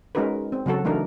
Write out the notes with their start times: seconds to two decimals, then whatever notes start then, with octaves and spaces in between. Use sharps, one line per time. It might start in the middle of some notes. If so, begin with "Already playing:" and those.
0.15 G#3 C#4 D#4 F#4 A#4 B4
0.52 C4
0.66 C#3 F#3 F#4 A4
0.85 E3 A3 D4 D#4 A#4